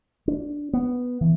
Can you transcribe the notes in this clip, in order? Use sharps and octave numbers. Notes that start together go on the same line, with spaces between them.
D4
B3
E3